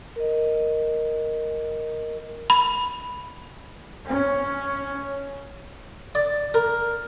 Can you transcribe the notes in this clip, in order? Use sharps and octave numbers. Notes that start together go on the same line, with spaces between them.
A#4 D#5
B5
C#4
D5
A#4